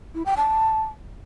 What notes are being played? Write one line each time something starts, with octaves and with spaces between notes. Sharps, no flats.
E4
G5
A5